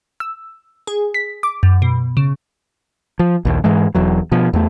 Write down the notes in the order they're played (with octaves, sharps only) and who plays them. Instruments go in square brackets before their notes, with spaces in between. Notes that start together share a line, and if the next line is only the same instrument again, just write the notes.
[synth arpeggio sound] E6
G#4
B6
D6
F#2
B2
C#3
[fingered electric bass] F3
A#1 D#2
G#2 E3 G#3
E1 E2 F#3
B2 F3
E2 A3